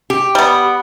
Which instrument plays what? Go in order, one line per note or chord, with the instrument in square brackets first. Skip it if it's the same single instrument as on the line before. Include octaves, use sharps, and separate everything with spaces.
[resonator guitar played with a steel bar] G4
[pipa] G3 B3